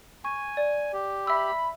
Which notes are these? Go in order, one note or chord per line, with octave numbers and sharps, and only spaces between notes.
G#5 C#6
D5
G4
E5 B5 E6